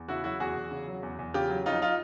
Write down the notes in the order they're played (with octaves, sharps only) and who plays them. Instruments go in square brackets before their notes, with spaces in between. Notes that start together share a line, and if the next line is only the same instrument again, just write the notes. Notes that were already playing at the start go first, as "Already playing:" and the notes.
Already playing: [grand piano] E2
C#3 E4 F#4
F#3 E4 F#4
E2 F#4 G#4
E2
C#3
F#3
E2
E2
C#3 F4 G4
F#3
F2 D#4 F4
D#4 F4